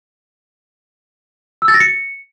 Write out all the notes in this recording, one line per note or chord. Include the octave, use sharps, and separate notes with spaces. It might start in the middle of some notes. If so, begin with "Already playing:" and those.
E6
A6
A#6
C#7